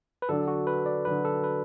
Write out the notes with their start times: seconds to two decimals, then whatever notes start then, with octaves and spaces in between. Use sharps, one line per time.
0.22 B4
0.29 D3 F#3 D4 A4
0.48 F#4
0.67 B4
0.86 D5
1.05 D3 F#3 D4 B4
1.25 A4
1.43 B4